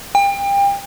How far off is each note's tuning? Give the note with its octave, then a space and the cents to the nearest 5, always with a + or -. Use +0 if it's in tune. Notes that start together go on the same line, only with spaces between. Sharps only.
G5 +30